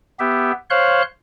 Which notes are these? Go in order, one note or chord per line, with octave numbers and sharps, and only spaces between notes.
B3 G4 E5
C5 C#5 F5 C6 F#6